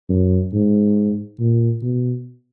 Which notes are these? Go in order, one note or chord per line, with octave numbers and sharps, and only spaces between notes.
F#2
G#2
A#2
B2